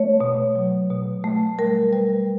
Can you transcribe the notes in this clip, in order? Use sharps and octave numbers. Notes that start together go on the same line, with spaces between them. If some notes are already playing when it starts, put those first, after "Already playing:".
Already playing: A3 C#5
B2
F#3
B2
A3
G3 A#4
G3 B4